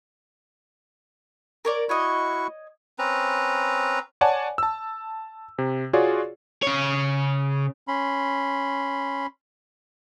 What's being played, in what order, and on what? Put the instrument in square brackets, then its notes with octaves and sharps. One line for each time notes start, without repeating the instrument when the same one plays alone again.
[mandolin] A#4 C#5 D5
[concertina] E4 F#4 C#6 [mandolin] C#5 D#5
[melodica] C4 C#4 B4 A#5
[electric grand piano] C#5 D5 F#5 G#5 A5
A5 E6
C3
F4 F#4 G#4 C#5 D5
[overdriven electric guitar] C#3 C#5
[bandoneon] C#4 B5 C6